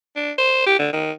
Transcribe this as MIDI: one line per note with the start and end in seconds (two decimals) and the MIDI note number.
0.16 0.32 62
0.38 0.63 72
0.66 0.79 67
0.79 0.88 50
0.93 1.11 51